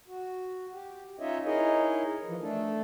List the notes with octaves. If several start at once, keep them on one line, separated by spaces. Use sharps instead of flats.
F#4
G4
C#4 D#4 F4 C#5 D#5 E5
D#4 E4 G#4 A#4 C#5 D#5
E3 F3
A3 D4 A4